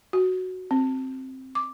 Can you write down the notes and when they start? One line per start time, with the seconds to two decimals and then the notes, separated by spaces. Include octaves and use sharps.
0.13 F#4
0.71 C4
1.55 D6